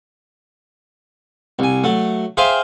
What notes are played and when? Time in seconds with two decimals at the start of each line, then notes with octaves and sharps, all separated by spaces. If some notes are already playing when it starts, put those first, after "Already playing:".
1.59 C2 G#5
1.84 F#3 A3
2.37 G#4 C5 E5 F5 G5 G#5